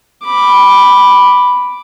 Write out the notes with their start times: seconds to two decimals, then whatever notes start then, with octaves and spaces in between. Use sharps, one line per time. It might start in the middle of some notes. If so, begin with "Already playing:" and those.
0.24 B5 D6